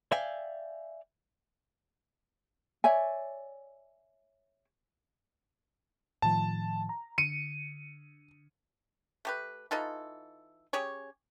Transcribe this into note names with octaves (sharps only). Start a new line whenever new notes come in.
D5 E5 F5 G5 G#5
C#5 D5 E5 G#5
A2 D#3 F3 A5
A#5
D3 C#7 D#7
A3 G4 B4
E3 D#4 F4 A4
C#4 G4 G#4 C#5